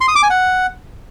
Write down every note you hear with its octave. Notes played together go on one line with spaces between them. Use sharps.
C6
D#6
D6
G#5
F#5